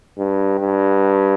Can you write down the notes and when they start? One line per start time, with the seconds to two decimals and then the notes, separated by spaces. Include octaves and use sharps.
0.18 G2
0.60 G2